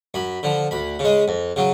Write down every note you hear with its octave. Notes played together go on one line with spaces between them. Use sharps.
F#2 B5
D3 F3
D2 B5
C#3 G#3
F2
C#3 F#3